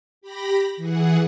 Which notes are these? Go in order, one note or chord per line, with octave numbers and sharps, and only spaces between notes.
G4 B5 A#6
E3 G#4 F#5